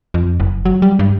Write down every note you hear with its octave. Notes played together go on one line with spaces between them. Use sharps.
F2
F#1
F#3
G3
G2